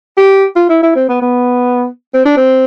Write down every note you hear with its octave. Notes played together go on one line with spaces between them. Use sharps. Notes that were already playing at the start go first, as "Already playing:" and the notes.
G4
F4
E4
E4
C4
B3
B3
C4
D4
C4